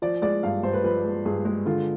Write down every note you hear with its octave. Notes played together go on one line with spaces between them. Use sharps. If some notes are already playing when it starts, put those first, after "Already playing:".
F3 D5
G#3 D5
G2 F5
G2 C5
B4
F3 B4
G#3
G2 G#4
G#3
D3 F4